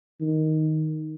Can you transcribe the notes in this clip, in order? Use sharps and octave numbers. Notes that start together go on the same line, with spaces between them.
D#3